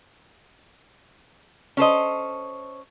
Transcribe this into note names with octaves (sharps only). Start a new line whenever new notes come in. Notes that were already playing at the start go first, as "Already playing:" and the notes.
C#4 A4 C5 D#5